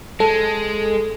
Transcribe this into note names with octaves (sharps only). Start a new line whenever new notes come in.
G#3 A4